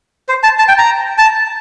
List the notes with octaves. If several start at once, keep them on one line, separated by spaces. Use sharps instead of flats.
C5
A5
A5
G5
A#5
A5